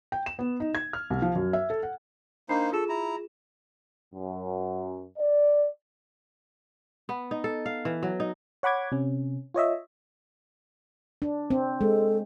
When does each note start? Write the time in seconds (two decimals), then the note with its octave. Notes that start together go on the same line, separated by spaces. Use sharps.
0.12 G5
0.26 E7
0.39 B3
0.60 D#4
0.75 G#6
0.93 F6
1.10 C2
1.22 F3
1.35 F#2
1.53 E5
1.70 A4
1.83 F#5
2.49 A#3 D4 D#4 C5 B5 C7
2.72 F4 G#4 A4 E7
2.89 E4 A#5
4.14 F#2
5.18 D5
7.09 B3
7.31 D#4
7.44 A4
7.66 F5
7.85 E3
8.03 F#3
8.20 D#4
8.63 C#5 F#5 B5 D6 G#6
8.92 C3 C#4
9.54 F4 C#5 D#5 E5
11.22 D4
11.50 C4
11.81 G#3 A4